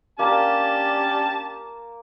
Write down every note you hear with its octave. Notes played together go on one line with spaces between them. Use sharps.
A#3 C#4 D4 G4 A5